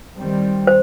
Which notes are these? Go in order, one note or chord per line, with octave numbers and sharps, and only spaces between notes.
D#3 G3 C4
C5